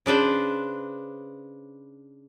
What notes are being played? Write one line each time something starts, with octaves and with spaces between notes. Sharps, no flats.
C#3 D4 B4 C5